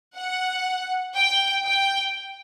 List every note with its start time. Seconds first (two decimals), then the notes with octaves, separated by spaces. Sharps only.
0.16 F#5
1.15 G5
1.64 G5